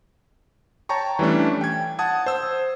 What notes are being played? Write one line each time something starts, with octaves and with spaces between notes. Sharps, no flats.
C#5 G5 A5 A#5 C#6
E3 G3 A3 C#4 D4
G5 G#6
F#5 A5 D#6 G#6
C5 E6